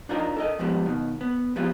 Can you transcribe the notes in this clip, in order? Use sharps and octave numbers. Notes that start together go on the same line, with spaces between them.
D4 D#4 F4 A#4 D5 D#5
A4 A#4 D#5
F2 G#2 F3 G3 B3
B2 D#3
B3
F3 B3 E4 F4 G4 G#4